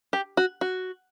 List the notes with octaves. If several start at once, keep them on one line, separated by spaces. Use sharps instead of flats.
G4
F#4
F#4